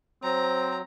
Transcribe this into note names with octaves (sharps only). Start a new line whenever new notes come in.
F#3 C4 C5 A#5